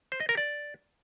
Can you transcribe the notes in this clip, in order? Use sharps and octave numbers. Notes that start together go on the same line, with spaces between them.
C5
D#5
A#4
D5